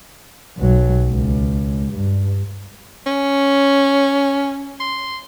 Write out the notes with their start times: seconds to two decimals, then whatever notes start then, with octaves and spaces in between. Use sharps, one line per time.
0.58 B1 F#3
1.07 C#2
1.92 G2
3.06 C#4
4.80 C6